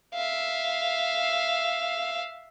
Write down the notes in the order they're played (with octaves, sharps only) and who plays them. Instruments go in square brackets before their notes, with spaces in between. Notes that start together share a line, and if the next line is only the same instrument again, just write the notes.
[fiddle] E5 F5